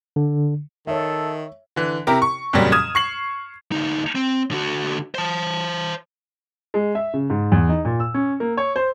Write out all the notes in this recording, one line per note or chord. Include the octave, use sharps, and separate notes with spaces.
D3
D#3 A4 C#5 E5
D3 E3
C3 E4 G4 A#4 A#5
C#6
F2 A#2 C#3 F#3 G3
D#6 F6 G#6 E7
C#6 C7 F#7
D2 D#4
C4
D3 F#4
C5 A5
G#3
E5
C#3
G#2
E2
D#4
A#2
E6
C#4
A#3
C#5
C5